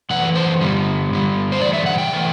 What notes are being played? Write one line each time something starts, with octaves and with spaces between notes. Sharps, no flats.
F#2 E3 A3 F#5
C5
G2 D3 G3
G2 D3 G3
C5
G2 E3 A3 D5
E5
F#5
G5
E3 A3